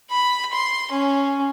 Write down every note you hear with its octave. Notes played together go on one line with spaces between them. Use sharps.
B5
C6
C#4